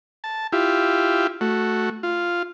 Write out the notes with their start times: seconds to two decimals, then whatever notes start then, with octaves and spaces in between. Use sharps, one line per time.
0.24 A5
0.52 E4 F4 G4
1.41 A3 F#4
2.03 F4